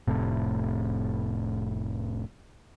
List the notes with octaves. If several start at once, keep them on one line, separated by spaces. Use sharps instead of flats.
F1 A2 C3